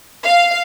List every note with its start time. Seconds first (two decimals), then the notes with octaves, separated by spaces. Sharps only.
0.24 F5